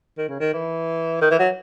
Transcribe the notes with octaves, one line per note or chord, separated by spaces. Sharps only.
D#3
C#3
D#3
E3
D#3
E3
F#3